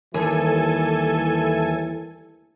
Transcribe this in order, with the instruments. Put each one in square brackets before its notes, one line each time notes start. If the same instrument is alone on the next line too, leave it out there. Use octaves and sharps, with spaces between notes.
[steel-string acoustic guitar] D#2 [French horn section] E3 G3 E4 [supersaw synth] A4 G#5